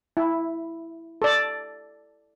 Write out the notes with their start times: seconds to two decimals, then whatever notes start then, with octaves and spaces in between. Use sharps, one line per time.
0.17 E4
1.22 A4 D5